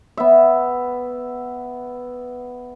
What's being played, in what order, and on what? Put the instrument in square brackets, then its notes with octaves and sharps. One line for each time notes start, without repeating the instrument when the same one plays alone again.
[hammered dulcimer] B3 E5